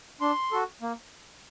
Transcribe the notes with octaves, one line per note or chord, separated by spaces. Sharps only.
D4 C6
F#4 A4
A#3